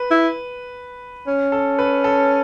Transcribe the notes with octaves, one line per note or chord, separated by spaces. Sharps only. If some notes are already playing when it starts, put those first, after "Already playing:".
Already playing: B4
E4
C#4
A4
B4
A4